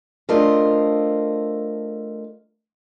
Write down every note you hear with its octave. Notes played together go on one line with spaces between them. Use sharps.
A3 D4 F4 A#4 C5 D#5